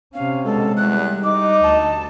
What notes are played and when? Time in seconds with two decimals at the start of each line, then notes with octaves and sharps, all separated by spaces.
0.14 C3 C#4 F5
0.45 B2 G#3 A4
0.77 E2 G3 F#6
1.24 D#4 D#5 D6
1.63 D2 A5